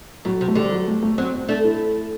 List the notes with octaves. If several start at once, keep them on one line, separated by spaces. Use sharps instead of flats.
A2 F#3
C3
A3
D3 G3
F#3
A3
A3
F#3 C4
C4
A3 D4
E4